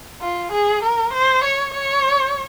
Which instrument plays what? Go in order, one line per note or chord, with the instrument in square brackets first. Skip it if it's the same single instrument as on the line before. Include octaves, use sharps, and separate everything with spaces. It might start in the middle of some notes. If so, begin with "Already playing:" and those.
[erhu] F4
G#4
A#4
C5
C#5
C#5